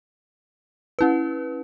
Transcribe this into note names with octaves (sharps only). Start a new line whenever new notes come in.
C#4 E4 B4